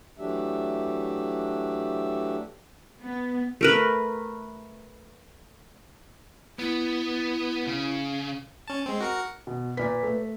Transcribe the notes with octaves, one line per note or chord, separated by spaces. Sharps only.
E3 F#3 A3 D4 G4 E5
B3
A3 A#4 B4
B3 E4
C#3
C#4 A5
G#3 C4
F#4 A#4 C#7
B2
A#2 B4 B6
A3